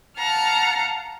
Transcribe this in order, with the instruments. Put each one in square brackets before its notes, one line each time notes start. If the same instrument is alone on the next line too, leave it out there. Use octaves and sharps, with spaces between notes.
[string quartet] F5 F#5 A5 A#5 F6